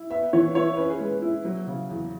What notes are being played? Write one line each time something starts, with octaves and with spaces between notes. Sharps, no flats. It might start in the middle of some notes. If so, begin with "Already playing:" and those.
Already playing: E4
B3 E5
E3 C#5
E4 C#5
C#4 B4
G#4
G#3 B4
E4
F#3
C#3
E2